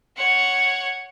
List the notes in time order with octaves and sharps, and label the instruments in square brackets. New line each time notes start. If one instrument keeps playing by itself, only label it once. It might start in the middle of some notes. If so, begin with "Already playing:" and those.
[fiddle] C#5 F#5